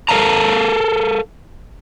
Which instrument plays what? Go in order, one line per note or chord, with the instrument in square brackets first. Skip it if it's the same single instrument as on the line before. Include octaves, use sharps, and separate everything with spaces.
[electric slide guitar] A4 A#4 C#5 F5 A5 A#5